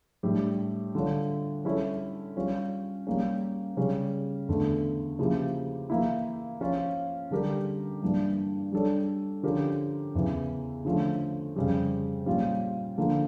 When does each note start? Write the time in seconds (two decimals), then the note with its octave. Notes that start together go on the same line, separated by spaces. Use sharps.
0.23 A2 G3 D4 G4
0.95 D3 G3 D4 F4 C#5
1.64 G3 C#4 E4 A4 C#5
2.36 G3 C#4 F4 C#5
3.07 G3 A#3 C#4
3.77 C#3 G3 C#4
4.49 E2 D3 A3
5.19 C#3 F3 A#3 E4 G4
5.90 E3 A#3 E4
6.61 F3 C#4 F4
7.31 D3 G3 D4 G4 A#4
8.02 G2 E3 A#3 D4
8.72 G3 D4 A4 C#5
9.43 D3 F3 C#4 G4 A#4
10.15 E2 C#3 E3
10.85 D3 F3 A3 C#4
11.56 F2 C#3 G3
12.26 A#2 G3 C#4 F4
12.98 D3 F3 A#3